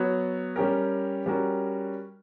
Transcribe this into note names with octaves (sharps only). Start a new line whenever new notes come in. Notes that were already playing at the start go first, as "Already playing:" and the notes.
Already playing: F#3 B3 F#4 C#5
G3 C#4 G4 A#4
G3 C#4 F#4 A#4